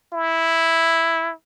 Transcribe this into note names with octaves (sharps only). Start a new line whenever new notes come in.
E4